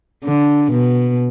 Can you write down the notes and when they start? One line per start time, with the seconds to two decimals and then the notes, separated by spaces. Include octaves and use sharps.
0.24 D3
0.72 B2